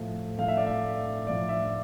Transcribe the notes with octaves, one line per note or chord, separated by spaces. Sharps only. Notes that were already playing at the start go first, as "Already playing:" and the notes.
Already playing: A2 F3 A3
A2 F3 A3 F5
E5
D5
E5
A2 F3 A3 D5
E5